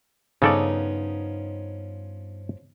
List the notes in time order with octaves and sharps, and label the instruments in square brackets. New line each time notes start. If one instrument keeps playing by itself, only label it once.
[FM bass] G2 [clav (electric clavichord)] C#3 A4 D5 [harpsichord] F3 C#4 [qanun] B3 D#4